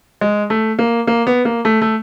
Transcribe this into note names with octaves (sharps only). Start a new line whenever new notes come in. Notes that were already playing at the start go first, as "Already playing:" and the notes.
G#3
A3
A#3
A#3
B3
A#3
A3
A3